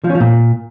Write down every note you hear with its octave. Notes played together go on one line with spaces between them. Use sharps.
F3
C#4
F3
A#2